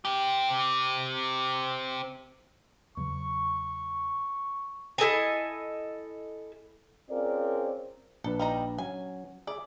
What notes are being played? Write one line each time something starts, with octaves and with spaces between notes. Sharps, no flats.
C4 G4
E2 C#3 F#3 C#6
E4 A4 D#5 G#5
C4 C#4 F4 G#4 A#4 D5
A#1 D4 A4 B4
G3 D#4 A#5
F#3 C#4 G#5
G#4 D5 E5